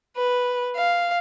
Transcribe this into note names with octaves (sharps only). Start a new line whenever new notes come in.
B4
F5